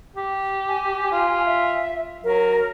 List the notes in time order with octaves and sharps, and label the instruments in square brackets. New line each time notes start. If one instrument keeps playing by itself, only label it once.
[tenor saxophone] G4
[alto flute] G#5
[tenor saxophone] F4
[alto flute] E5
[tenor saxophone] F#3 [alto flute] A#4